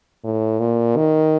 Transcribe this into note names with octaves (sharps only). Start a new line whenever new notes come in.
A2
A#2
D#3